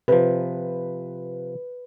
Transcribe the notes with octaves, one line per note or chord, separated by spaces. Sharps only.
C3 F3 B4